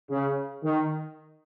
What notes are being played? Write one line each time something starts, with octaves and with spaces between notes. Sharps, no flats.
C#3
D#3